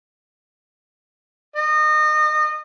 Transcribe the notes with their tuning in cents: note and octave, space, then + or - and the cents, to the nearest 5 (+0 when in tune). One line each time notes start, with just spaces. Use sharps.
D#5 -30